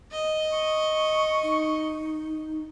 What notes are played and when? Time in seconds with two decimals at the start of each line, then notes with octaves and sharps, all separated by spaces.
0.12 D#5
0.53 C#6
1.43 D#4